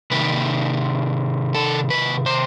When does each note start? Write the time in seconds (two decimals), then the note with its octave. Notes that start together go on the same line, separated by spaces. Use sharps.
0.11 C3 D#3 B4
1.54 A4
1.90 B4
2.26 C5